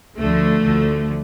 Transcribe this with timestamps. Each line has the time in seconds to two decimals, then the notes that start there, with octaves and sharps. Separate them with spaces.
0.17 D2 D3 F3 A3
0.63 D2 D3 F3